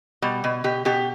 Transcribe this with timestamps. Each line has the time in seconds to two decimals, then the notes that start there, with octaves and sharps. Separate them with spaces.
0.22 B2 G3
0.44 B2
0.64 B2 G4
0.85 B2 G4